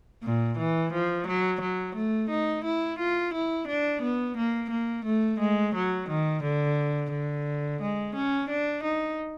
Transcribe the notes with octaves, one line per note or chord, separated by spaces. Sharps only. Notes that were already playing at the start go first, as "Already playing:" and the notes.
A#2
E3
F3
F#3
F#3
A3
D#4
E4
F4
E4
D4
B3
A#3
A#3
A3
G#3
F#3
D#3
D3
D3
G#3
C#4
D4
D#4